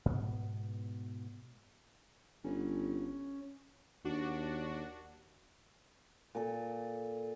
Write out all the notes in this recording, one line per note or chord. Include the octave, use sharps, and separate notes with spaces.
G#2 B2 B3
G1 C#4
D#2 D4 F#4
A#2 A4